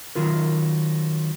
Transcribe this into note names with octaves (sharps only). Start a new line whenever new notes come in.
D#3 F#3 F4 A#4